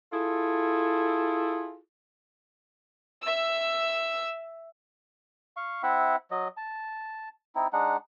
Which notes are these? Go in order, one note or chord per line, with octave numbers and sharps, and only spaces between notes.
E4 F4 G#4 A4
E5 E6
F5 C#6
C4 E4 E5 F#5
F#3 D#5
A5
C4 D#4 E4
G#3 D4 D#4 F#5